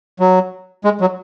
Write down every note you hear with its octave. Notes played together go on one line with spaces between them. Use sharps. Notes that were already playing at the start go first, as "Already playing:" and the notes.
F#3
G#3
F#3